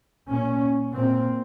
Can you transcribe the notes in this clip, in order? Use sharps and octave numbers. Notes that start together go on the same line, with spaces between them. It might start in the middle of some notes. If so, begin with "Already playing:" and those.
A#2 C#4
A#2 C4